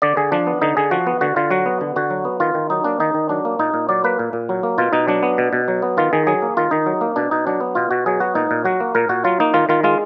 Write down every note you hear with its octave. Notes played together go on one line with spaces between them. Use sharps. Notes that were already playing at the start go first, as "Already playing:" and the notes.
D3 D5
D3 G#4
F3 D4
B3
D3 D#4
D3 G#4
F3 F#4
B3
D3 F#4
D3 F4
F#3 F#4
B3
D3
D3 F#4
F#3
B3
D#3 F4
D#3
F#3 D#4
A#3 D4
D#3 D#4
D#3
F#3 D4
A#3
A#2 D#4
A#2
F#3 D5
A#3 B4
A#2
A#2
F#3
A#3
B2 F4
B2 D#4
F#3 D4
B3
B2
B2
F#3
B3
D#3 F4
D#3 G#4
F#3 G#4
A#3
D#3 F4
D#3 D#4
F#3
A#3
B2 D4
B2 D#4
F#3 D4
B3
B2 F4
B2 F#4
F#3 G#4
B3 F#4
A#2 D#4
A#2
F#3 F#4
A#3
A#2 A#4
A#2 F#4
F#3 F4
A#3 D#4
D#3 F4
D#3 F4
G#3 F4